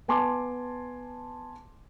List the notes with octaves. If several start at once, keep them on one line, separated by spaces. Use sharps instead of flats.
B3 G#5 A5 C6 D6